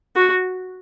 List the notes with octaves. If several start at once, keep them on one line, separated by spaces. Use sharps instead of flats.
F#4